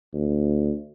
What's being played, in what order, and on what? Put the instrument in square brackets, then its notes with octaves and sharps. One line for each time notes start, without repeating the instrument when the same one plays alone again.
[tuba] D2